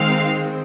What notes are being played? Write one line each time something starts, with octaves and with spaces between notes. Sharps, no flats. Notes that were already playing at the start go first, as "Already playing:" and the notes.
Already playing: D#3 G#3 C4 F5